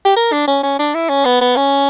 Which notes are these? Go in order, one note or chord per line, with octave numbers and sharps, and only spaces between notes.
G4
A#4
D4
C#4
C#4
D4
E4
C#4
B3
B3
C#4